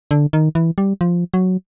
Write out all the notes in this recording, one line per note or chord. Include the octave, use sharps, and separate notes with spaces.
D3
D#3
E3
G3
F3
F#3